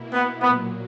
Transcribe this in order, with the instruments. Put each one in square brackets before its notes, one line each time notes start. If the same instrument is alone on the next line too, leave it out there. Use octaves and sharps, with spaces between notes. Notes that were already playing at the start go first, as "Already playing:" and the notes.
Already playing: [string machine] B2 A#3 E4
[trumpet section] B3
[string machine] A#2 F#3 A#3 [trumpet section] B3